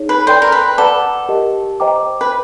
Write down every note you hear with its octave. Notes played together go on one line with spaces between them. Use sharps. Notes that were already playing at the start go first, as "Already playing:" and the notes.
Already playing: D#4 G#4 C#5
B4
A4 C5 D5 G5 B5
A#4
B4
A4 B4 D5 F#5 A5 D6
G4 A#4 D#5
C5 D#5 G5 A#5 D6
B4